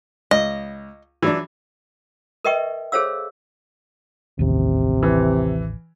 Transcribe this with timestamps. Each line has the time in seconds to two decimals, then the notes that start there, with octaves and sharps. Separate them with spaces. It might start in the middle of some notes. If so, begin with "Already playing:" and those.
0.31 C#2 D#5
1.22 E3 F#3 D4
2.45 A#4 B4 D#5 E5 G5 C#6
2.92 G#4 A4 C5 C#5 F5 E6
4.39 A1 D#2 C3
5.03 E3